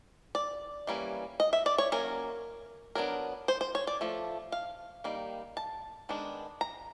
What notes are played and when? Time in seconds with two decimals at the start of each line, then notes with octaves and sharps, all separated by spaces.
0.35 D5
0.87 E3 G3 A#3 C#4
1.40 D#5
1.53 E5
1.66 D5
1.78 C#5
1.92 F#3 A#3 C#4 A#4
2.95 F#3 B3 D4 A#4
3.48 C5
3.61 C5
3.75 C#5
3.87 D5
4.01 F3 A3
4.52 F5
5.04 D#3 G3 A#3
5.57 A5
6.09 D#3 G#3 B3 D4
6.61 A#5